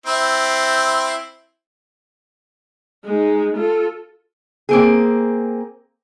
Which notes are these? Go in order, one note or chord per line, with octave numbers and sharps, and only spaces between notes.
C4 E4
G#3 D#4
F4 A4
A#3 C4 G#4